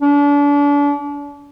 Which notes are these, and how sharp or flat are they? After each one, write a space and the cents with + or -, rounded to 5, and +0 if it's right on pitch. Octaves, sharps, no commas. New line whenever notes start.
D4 -35